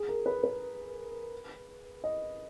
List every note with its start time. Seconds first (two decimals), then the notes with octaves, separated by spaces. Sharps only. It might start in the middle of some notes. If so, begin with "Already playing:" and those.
Already playing: G#4
0.09 A#4
0.26 B4
0.44 B4
2.04 D#5